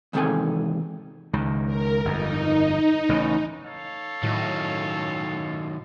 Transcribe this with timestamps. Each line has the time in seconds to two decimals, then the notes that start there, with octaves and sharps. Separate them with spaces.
0.13 E2 G#2 C3 D#3 A4 G#5
1.33 C#2 D#3
1.66 A#4
2.05 G1 F2 D#4
3.09 A1 C#3
3.64 A4 C#5 F5
4.23 A2 D#3 F#3 D#4